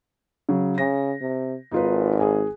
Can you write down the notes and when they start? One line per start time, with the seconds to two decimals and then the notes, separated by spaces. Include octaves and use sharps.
0.49 C#3 F#3
0.78 C#3 A#6
1.21 C3
1.72 G#1 D#4 F4 B4
2.20 G#4 G#5